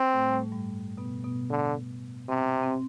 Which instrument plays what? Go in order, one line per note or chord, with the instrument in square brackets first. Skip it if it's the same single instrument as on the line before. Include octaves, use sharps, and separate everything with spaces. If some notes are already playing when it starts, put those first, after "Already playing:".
Already playing: [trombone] C4
[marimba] A2 A3
G3
A2 A3
G2 G3
B2 B3
B2 B3
[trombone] D3
[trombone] C3 [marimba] C4
[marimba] C4
C4